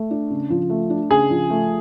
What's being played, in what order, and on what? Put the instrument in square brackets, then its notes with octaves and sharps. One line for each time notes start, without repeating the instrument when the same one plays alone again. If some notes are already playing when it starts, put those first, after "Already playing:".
Already playing: [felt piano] A3
D4
C#3
F3
A3
D4
[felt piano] C#3 [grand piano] G#4
[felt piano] F3
A3